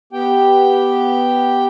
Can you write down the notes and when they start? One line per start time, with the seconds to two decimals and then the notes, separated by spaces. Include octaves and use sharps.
0.13 B3 G4 G5